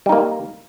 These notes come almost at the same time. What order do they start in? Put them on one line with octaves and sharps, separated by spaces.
G3 D#4 A#3